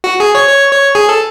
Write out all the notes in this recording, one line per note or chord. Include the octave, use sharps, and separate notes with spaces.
F#4
G#4
C#5
C#5
C#5
G#4
A4